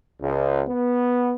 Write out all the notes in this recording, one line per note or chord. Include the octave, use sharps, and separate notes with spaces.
C#2
B3